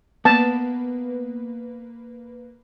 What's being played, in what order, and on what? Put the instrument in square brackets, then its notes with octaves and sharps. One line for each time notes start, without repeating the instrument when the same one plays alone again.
[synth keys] A#3 B4 [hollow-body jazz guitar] B3 [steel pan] A5